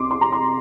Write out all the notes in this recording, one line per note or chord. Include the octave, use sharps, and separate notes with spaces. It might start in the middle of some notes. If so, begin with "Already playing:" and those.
Already playing: C2 C3 C6 D6
C6
A#5
C6